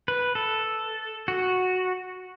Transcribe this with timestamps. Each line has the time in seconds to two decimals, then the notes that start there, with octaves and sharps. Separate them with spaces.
0.08 B4
0.35 A4
1.28 F#4